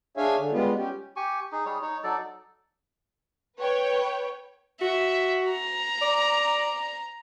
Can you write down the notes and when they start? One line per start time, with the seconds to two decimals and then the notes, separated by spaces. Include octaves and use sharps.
0.17 D4 G#4 C#5 E5 F5 G#5
0.37 D3
0.52 G3 G#3 B3 F4
0.77 C#4 G4
1.16 G4 G#5 C#6
1.52 D#4 G#4
1.66 G3 G#4 C#5
1.82 D#4 C#5
2.04 F#3 D#4 A4 D5
3.59 B4 C#5 G5
4.81 F#4 E5
5.51 A#5
6.02 D5